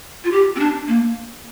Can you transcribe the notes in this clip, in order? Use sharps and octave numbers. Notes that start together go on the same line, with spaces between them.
F4
G4
C4
D4
A#3